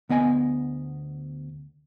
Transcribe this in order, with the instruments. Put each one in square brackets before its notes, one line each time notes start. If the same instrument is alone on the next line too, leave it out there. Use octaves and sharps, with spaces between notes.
[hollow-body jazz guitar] D2 B3 D#5 G#5